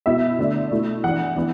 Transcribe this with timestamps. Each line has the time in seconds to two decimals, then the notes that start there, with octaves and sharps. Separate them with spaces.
0.06 B2 B3 E4 E5
0.39 D3 A3 D4
0.71 B2 A3 E4
1.04 E3 D4 F#5
1.36 E3 B3